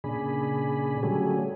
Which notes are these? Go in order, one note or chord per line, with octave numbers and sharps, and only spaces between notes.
A#2 C#3 D4 G#4 B5
D3 F#3 G3 A3 C#4 G#4